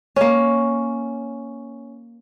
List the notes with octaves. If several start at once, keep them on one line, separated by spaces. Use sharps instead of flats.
A#3 C#4